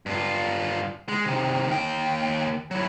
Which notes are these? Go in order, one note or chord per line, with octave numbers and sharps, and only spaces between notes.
G2 F4
G#3
C3 D#3
D#2 G5
F#3 E4